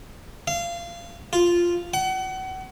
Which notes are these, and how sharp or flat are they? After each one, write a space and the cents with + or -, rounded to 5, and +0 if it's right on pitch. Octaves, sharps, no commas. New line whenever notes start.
F5 -25
F4 -5
F#5 +35